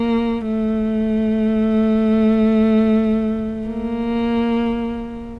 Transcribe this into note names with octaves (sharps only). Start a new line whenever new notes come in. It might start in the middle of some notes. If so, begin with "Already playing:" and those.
Already playing: A#3
A3
A#3